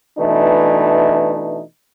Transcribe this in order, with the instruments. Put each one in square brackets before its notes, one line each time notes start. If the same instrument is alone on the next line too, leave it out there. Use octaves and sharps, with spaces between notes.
[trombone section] B2 E3 A3 D4 D#4